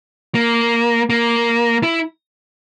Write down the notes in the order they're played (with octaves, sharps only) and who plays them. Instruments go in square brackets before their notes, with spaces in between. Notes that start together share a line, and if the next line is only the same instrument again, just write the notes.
[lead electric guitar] A#3
A#3
E4